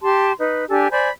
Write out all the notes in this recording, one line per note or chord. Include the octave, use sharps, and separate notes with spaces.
G4 A5 C6
D#4 B4
D4 G4 A4 G#5
C5 D5 G#5 B5